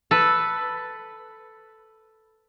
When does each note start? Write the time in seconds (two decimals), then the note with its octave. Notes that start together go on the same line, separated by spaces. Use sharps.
0.11 A4 B4